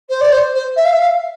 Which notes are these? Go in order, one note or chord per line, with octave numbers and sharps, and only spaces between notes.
C5
D5
C5
C5
E5
F5
E5
F5